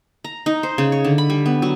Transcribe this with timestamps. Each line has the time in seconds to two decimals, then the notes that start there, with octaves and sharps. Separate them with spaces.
0.24 A#5
0.46 D#4
0.63 C5
0.78 C#3
0.92 C#5
1.05 D3
1.18 B5
1.30 G3
1.46 B3
1.62 F#3